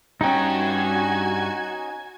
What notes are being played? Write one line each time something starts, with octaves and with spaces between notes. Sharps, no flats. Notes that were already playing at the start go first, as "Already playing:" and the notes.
G2 C#4 D#4 F#4 G5 G#5 G#6